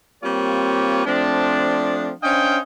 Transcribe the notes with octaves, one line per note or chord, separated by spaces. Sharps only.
G3 A#3 C4 F4 G4 C#5
F3 A3 C4 D4
C#4 D4 C5 D#5 F5 G5